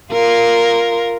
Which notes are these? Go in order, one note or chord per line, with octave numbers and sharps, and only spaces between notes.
F4 A#4